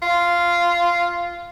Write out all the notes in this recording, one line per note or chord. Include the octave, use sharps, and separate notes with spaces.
F4